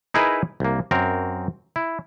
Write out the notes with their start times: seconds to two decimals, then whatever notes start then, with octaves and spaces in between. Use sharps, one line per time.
0.14 D#4 E4 G#4 A#4 B4 E5
0.60 C2 A#3
0.91 F#2 C4 A#4
1.76 E4